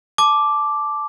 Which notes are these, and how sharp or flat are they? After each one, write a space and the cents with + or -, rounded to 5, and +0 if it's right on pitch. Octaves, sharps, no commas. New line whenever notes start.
A5 -20 D6 +0